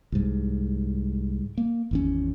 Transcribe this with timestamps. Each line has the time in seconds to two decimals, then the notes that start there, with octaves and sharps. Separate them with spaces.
0.12 C2 G#2
1.58 A#3
1.91 G#1 E2 C#4